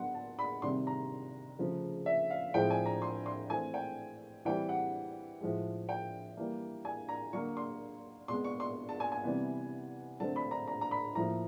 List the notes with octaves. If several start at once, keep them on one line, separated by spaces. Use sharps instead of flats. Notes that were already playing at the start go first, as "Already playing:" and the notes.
Already playing: D3 F#3 B3 F#5 C6
A5
B5
C3 D#3 G3 C6
A#5
C#3 F3 A3
E5
F5
A2 F3 G#3 C4 G5
G#5
A#5
C6
C6
E3 A3 C4 G#5
G5
E3 G3 C4 G5
F#5
A2 F3 G#3
G5
E3 G3 A#3
G#5
A#5
D3 F#3 A#3 C#6
C6
B2 G#3 B3 C6
C#6
C6
A5
G#5
G#5
C3 E3 G3 B3
D3 F#3 A3 C4 A5
B5
A#5
A#5
A#5
B5
A2 F3 A#3 A#5